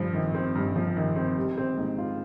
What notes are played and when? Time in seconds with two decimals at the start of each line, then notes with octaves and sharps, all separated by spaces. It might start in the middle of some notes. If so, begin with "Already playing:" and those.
Already playing: G2 F3
0.14 G#1
0.34 C4
0.55 G2
0.76 F3
0.96 G#1
1.16 C4
1.37 G3
1.57 C4
1.78 G#2
1.98 F4